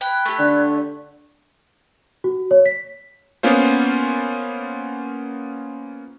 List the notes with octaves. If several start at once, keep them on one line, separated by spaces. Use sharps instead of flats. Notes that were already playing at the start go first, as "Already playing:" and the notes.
G5 B5 F#6 G#6
A3 G4
D3 D5
F#4
C#5
B6
A#3 B3 C#4 F4 C5